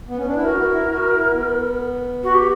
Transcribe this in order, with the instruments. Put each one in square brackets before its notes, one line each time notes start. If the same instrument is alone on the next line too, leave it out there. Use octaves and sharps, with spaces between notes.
[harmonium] B3
C#4
D4
[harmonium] E4 [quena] B4
[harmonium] F#4 [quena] A#4
[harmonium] F#4
E4
F#4
E4
B3
[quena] F#4
G4